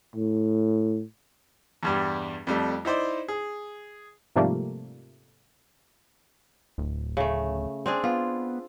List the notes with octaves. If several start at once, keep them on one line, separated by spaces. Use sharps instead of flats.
A2
E2 G2 G3
F2 G3 A3
D#4 E4 C5 D5
G#4
G#2 C3 F3 G3 A3 A#3
D1
C#3 A3
C4 D4 G#4
B3 F4